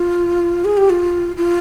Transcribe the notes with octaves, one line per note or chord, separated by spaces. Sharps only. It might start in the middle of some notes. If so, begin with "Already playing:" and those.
Already playing: F4
G#4
G4
F4
F4